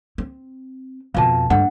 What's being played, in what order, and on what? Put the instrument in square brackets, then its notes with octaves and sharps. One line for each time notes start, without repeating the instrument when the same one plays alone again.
[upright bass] C4
[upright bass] F2 B2 [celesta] F5 A5
[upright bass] G2 A3 [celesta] F#5